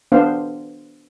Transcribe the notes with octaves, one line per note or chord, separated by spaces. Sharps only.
B3 D4 C5 F5